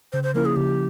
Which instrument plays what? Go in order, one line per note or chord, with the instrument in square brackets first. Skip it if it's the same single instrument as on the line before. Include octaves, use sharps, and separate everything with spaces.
[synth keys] C#3 [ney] C5
[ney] C5
[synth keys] F3 A#3 C#4 E4 [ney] A#4
[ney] G#4
[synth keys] C#3 [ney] G4